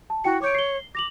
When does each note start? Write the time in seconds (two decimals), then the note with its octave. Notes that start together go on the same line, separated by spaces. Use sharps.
0.10 A5
0.24 E4 F#4 G5 C#7
0.42 C#5 D6 G6 D7
0.55 C7 G7
0.95 D6 A#6 F7 F#7